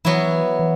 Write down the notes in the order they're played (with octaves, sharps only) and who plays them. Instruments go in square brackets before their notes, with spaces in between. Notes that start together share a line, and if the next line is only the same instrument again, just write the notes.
[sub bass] E3 [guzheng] F#3 B3 E4
[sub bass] E3